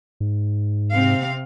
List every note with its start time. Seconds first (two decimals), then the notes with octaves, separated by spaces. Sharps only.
0.20 G#2
0.92 C3 C4 F5